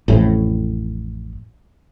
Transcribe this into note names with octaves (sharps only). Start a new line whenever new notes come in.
A1 F2 A2